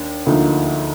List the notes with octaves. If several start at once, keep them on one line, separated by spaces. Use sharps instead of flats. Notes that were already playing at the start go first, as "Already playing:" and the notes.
Already playing: D#2 D4
D2 D3 F3 A#3 D#4